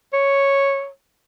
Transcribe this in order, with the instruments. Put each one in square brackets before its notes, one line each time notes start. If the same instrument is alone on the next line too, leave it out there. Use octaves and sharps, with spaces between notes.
[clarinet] C#5